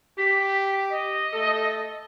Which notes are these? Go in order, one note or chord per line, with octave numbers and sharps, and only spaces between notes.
G4 B6
D#5
A3 A4